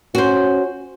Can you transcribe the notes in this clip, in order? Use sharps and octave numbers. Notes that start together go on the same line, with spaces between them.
C#4 F#4 C5